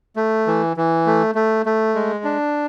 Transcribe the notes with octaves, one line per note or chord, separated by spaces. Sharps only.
A3
E3
E3
A3
A3
A3
G#3
D4